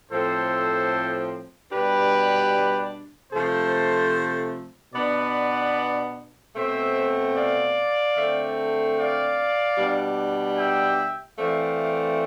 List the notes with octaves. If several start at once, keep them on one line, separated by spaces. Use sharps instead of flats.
A2 F3 C4 A4 C5
B2 G3 D4 G4 B4
C3 F3 A3 A4 C5
B2 B3 D4 B4 D5
B2 A3 C4 C5 E5
D5 F5
D3 A3 C4
D5 F5
B2 G3 D4
E5 G5
E3 A3 C4 D5 F5